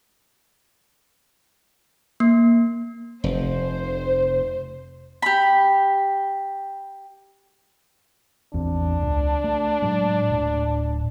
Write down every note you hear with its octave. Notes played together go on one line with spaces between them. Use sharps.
A#3
F1 C5
G4 B5
A1 E2 C4 D4
C#2
A3
A2 F#3 G#3
D1 A2